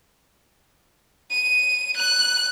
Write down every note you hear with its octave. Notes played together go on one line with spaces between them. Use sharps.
D#7
F#6